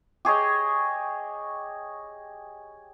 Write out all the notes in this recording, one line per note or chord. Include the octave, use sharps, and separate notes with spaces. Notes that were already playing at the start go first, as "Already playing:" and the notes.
G4 G#4 C#5 D#5